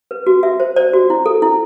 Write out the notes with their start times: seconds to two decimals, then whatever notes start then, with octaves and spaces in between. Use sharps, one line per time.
0.11 B4
0.27 F#4
0.43 F#4 E5
0.60 C5
0.76 C5 D5
0.93 F#4
1.10 E4
1.26 A4
1.42 E4